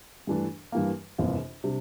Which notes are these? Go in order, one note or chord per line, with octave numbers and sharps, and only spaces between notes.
G2 E3 A3 D4
G2 E3 A#3
G1 F2 C3 E3 A#3
C3 G3 D4